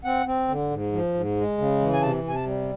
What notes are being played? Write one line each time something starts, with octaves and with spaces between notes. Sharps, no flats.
C4 F#5
C4
D3
G#2
F3
G#2
G#3
C#3
E3
G#5
C3 A5
C3 G#5
A5
G3